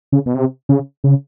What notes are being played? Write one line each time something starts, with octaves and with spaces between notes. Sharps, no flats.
C#3
B2
C3
C#3
C#3